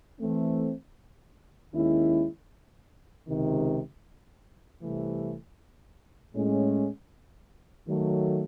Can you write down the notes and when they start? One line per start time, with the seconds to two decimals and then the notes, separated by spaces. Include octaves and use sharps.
0.18 E3 A3 C4
1.72 D#2 D#3 G#3 C#4 E4
3.26 C#2 C3 D#3
4.81 C2 C3 E3 A3
6.34 A2 G#3 C#4
7.88 D#3 F#3 A3